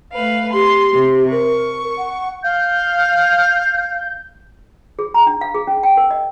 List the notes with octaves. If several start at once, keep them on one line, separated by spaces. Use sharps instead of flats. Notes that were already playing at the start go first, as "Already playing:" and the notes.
A3 B4 F5
G4 C6
C3 G4
A#4 C#6
F#5
F5 G6
G#4
A#5
D4
F5
G#4
C#4
G5
A#4
D#5